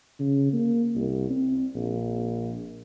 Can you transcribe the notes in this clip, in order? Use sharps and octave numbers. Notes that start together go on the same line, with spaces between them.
C#3
A#3
C2
C4
A#1